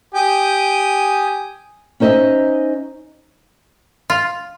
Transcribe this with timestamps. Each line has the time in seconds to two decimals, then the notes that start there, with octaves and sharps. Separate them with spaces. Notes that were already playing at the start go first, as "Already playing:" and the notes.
0.15 G4 G#5 D#6
2.00 C#4 D#4 C5 D#5 E5
4.10 F4